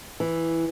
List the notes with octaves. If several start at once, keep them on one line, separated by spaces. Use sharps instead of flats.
E3